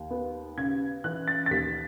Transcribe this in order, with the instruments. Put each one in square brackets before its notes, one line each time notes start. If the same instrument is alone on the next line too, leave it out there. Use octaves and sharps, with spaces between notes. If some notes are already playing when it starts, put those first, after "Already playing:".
Already playing: [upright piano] D#2
B3
C#3 G#6
E3 F#6
A6
A6
D#2 B6